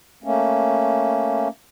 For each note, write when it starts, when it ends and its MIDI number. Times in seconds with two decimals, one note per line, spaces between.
0.24 1.48 57
0.24 1.48 58
0.24 1.48 61